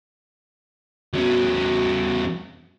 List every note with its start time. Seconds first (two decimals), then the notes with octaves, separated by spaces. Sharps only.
1.13 E2 B3 C#4 F#4